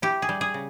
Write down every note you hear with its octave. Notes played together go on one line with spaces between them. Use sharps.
E4 G4
G#4
G3
G#4
C#3